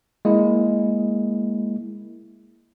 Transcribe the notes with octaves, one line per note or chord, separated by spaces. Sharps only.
G#3 A#3 E4